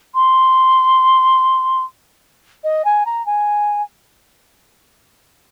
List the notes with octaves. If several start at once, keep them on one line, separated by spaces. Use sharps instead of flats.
C6
D#5
G#5
A#5
G#5